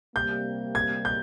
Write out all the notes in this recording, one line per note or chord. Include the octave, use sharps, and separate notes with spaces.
C3 G3 A#3 G6
G#6
G6